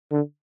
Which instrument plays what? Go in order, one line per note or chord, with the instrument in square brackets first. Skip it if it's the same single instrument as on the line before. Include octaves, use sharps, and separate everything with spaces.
[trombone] D3